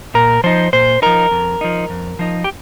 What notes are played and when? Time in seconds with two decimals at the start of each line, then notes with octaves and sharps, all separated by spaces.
0.14 A#2 A#4
0.44 F3 D#4 C5
0.73 A#2 C5
1.02 F3 D#4 A#4
1.31 F2
1.61 F3 D#4
1.90 F2
2.19 F3 D#4
2.44 G4